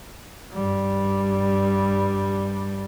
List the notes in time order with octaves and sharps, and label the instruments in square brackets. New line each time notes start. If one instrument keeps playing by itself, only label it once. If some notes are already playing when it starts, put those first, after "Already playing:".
[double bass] G2 G3